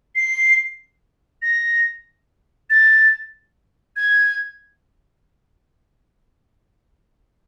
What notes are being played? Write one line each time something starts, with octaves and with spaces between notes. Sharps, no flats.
C7
A#6
A6
G#6